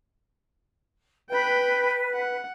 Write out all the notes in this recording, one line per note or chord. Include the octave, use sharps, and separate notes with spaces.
B4 G5 B5
F#5